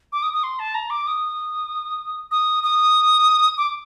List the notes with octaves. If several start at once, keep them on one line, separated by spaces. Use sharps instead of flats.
D6
D#6
D#6
C6
A5
A#5
D6
D#6
D#6
D#6
D6